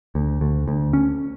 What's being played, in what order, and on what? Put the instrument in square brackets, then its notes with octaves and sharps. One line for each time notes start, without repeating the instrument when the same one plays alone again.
[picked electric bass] D2
D2
D2
C#4